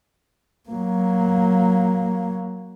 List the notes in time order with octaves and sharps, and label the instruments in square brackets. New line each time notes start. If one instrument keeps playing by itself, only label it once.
[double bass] F#3 A#3